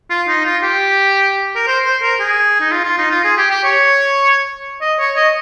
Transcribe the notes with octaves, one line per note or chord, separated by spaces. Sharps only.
F4
D#4
F4
G4
A#4
C5
C5
A#4
G#4
D#4
F4
F4
D#4
F4
G#4
G4
G4
C#5
D#5
C#5
D#5